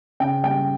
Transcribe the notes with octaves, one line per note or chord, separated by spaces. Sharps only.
C#3 G5
G3 G5